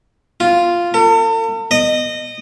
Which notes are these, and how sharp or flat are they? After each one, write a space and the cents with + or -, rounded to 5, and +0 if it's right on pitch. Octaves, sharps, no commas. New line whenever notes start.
F4 -5
A4 +45
D#5 -20